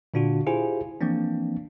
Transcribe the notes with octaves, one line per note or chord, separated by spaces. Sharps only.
A#2 D3 D4 F4 F#4
E4 F4 G4 G#4 C5 G#5
E3 F3 A#3 C4 D4